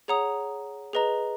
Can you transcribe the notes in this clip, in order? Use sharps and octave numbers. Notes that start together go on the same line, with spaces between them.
G#4 C#5 F#5 A#5 D#6
G#4 B4 D#5 A#5